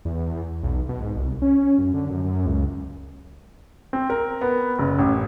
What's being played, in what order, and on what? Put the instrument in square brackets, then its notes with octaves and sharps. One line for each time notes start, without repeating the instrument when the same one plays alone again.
[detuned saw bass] E2
B1
B2
G#2
C2
C#4
F#2
D3
F#2
F#2
C#2
[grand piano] C4
A#4
B3
F#1
A1